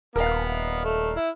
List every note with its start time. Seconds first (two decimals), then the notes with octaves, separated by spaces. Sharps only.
0.16 D#1 B3 A#4 F5
0.84 A3
1.17 E4